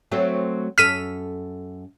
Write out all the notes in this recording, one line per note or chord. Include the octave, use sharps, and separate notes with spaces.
F#3 A3 C4
F#2 A4 F6 B6 D#7